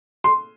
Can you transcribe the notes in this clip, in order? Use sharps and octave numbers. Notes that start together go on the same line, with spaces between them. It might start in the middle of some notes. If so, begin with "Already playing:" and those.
C6